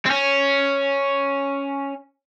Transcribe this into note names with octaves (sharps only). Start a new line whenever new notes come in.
C4
C#4